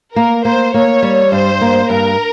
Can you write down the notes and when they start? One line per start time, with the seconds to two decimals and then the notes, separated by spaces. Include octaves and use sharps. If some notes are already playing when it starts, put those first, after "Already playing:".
0.15 A#3 A#4
0.45 A#3 C5
0.74 A#3 C#5
1.02 G3
1.32 G2 C5
1.61 A#3
1.90 G2 A#4